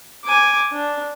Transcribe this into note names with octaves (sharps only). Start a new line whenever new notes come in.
G#5 D6
D4